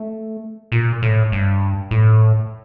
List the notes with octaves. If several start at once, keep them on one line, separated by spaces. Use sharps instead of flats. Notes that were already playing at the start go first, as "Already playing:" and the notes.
Already playing: A3
A#2
A2
G2
A2